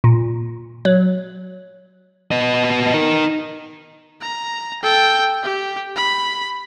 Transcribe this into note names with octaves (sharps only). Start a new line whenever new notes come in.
A#2
F#3
B3 D#5
D#4 A#4
A#5
A4 G5
G4
B5